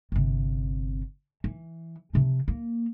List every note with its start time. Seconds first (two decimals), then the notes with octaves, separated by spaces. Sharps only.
0.12 G1 C3
1.44 E3
2.13 C3 F3
2.48 A#3